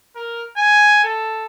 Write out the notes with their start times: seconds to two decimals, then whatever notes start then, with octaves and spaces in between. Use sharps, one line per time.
0.16 A#4
0.57 G#5
1.04 A4